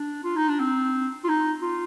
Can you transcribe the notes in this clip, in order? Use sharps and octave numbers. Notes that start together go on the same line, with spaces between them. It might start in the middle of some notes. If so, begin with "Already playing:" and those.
Already playing: D4
F4
D#4
D4
C4
F4
D#4
F4